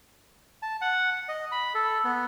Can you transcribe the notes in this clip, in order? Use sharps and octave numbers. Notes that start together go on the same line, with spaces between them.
A5
F#5
D#5
B5
A4
B3